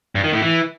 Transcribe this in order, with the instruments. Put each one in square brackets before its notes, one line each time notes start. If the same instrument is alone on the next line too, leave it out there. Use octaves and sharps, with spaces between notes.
[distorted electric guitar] G2
D#3
A2
E3